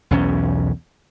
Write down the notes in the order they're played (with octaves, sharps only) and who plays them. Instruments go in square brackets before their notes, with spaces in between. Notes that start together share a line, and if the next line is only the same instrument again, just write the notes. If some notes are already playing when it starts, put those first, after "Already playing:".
[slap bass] B1 E2 C#4